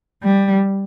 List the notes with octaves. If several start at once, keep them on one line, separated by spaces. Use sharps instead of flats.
G3